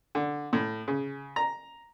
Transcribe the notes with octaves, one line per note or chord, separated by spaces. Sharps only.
D3
A2
C#3
A#5